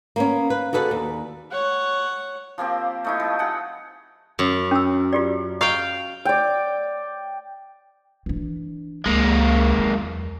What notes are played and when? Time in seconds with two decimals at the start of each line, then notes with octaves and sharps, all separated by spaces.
0.16 A#3 B3 C#4
0.50 B4
0.73 F#4 G#4 A4 B4 D5
0.91 D#2
1.51 C#5 F#5
2.58 F3 A#3 C4 G4
3.05 A3 D#4 E4
3.20 F3
3.39 G#4 F#5 G5
4.39 F#2
4.71 C#4 E6
5.13 F4 G4 D5
5.61 D#5 F5 G5 A#5 C#6
6.25 D5 G5
8.26 E3 D4
9.06 C#2 G#3 A#3
9.78 E2 F#3